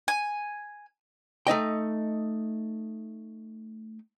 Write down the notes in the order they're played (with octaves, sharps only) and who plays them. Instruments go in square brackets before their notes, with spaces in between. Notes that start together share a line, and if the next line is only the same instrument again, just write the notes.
[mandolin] G#5
[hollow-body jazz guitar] A3 D#4 D#5 G5